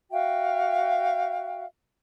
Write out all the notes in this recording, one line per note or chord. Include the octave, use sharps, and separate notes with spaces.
F#4 E5 F5 G5